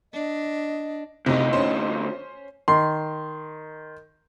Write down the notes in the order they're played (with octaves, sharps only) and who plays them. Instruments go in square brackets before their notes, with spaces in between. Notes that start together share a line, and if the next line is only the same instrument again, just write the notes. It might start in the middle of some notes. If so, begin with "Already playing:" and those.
[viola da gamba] D4 [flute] D#5
[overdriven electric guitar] D2 D#4 [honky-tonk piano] C3
[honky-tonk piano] C#4 C5
[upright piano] D#3 C6